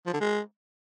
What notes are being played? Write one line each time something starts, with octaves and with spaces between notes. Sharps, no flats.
F3
D3
G#3